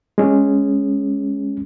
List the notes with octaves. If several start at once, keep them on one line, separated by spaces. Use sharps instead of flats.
G#3 C#4